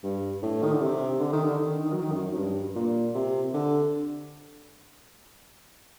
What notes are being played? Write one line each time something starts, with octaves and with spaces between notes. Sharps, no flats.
G2
A2
D#3
D3
C3
D3
D#3
D3
D#3
D#3
F#3
D#3
F#2
F#2
G2
A#2
C3
D3